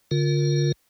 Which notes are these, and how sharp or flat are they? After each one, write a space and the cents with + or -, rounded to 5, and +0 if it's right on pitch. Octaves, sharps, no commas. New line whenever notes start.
D3 -30 F4 +15 A#4 +0